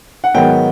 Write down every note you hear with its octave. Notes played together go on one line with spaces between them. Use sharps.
F#5
G#2 D#3 F#3 B3 G5